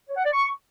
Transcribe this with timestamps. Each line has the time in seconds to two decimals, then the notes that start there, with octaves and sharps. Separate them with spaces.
0.09 C#5
0.16 F#5
0.24 D5
0.31 C#6